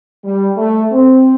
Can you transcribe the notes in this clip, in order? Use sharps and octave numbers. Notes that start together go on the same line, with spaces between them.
G3
A3
C4